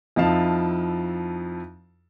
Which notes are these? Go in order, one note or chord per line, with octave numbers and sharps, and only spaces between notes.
F2 F3 D#4 E4 F5 A5